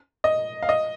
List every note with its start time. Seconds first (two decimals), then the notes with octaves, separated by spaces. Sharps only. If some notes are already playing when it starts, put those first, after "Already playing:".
0.24 D#5
0.63 F5
0.69 D#5